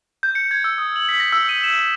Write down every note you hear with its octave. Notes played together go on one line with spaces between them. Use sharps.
G6
C#7
G#6
E6
D#6
F#7
B6
A#6
E6
D#7
E7